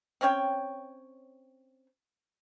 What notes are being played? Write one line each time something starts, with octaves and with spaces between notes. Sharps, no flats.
C4 C#4 C#5 G5